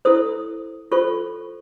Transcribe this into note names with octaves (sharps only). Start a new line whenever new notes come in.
E4 A4 C5 D#6
F4 A4 C5 C#6